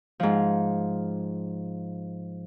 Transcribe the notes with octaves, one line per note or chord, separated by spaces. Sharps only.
G#2 F3